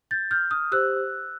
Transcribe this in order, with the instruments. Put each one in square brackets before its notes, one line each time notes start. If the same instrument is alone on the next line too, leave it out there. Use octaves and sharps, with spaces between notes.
[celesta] G6 A6
F6 G6
D#6 F6
G4 C5 E6 F#6